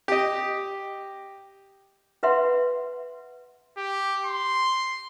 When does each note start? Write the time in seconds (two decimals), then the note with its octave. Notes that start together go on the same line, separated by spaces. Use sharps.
0.08 G4 D#5
2.23 F4 B4 E5 F#5 C6
3.77 G4
4.26 C6